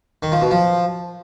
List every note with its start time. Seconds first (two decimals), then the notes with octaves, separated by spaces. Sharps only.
0.23 D#3
0.32 F3
0.42 B2
0.51 F3